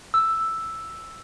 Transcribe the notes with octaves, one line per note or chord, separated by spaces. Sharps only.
E6